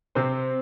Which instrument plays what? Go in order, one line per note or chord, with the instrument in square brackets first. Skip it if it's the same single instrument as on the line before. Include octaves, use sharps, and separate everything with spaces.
[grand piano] C3 C4 C5